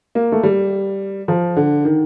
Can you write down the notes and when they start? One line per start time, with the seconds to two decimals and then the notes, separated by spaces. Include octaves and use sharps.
0.15 A#3
0.32 A3
0.43 G3
1.28 F3
1.56 D3
1.85 D#3